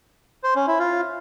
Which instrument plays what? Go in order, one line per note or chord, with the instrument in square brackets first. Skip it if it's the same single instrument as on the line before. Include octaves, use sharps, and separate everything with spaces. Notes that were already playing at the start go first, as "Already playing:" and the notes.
[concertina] C5
C#4
E4
F4